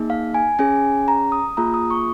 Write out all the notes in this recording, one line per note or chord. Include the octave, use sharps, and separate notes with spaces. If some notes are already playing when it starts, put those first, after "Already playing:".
Already playing: A#3 D#4 G#4
F5
G#5
C#4 G#4 G#5
A#5
D#6
A#3 F4 G#4 A#5
D#6
C#6